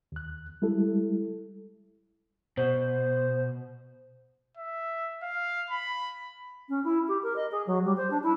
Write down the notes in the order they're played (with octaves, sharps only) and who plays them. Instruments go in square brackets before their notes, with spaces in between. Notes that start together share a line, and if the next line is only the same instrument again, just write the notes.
[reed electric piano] D#2 F#6
G3 G#3 E4 A4
[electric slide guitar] B2 [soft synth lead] C5
[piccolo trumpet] E5
F5
B5
[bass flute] C#4
E4
G4
A#4
D#5
G#4
F#3
G3
C5
D4
E4